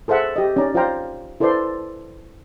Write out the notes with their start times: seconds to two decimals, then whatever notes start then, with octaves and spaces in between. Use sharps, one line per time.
0.08 G#4 A4 C5 E5 F#5
0.36 G4 D#5
0.56 C#4 D#4 D5 A#5
0.75 F4 C5 D5 F5 G5 A#5
1.40 E4 A4 B4 C5 D5 C6